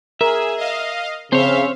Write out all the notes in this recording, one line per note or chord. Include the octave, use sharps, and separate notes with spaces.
G#4 A#4 E5
D#5 F5
C#3 C4 C5 C#5 E5 F5